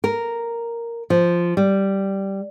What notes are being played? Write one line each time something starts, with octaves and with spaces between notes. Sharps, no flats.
A#4
F3
G3